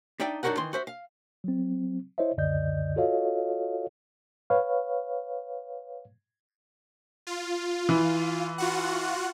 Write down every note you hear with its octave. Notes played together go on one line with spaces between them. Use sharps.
D4 D#4 D5 E5 G5
F#2 D4 D#4 F#4 A#4 F#5
D#3 E3 C6
F#4 C5 E5
F5
F#3 C4
E4 C5 C#5 D#5 E5
C#2 F#2 D3 D5 D#5 G6
F4 F#4 A4 C#5 D#5 F5
B4 C#5 F5
F4
E3
F4 F#4 F#5